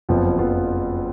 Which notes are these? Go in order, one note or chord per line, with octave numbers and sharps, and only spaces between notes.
F#1 F2 F3 B3 F4
F#1 F2 F3 B3 F4